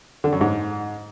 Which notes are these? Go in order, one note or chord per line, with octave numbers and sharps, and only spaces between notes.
D3
F#2
G#2